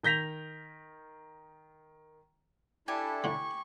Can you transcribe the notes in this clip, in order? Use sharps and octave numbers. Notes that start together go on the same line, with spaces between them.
D#3 G6 A#6 B6 F7
D4 E4 G4 A4 G#5 A5
A2 D3 C#6